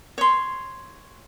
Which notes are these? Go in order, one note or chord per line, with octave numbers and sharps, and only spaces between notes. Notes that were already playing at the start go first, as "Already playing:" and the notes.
C#5 C6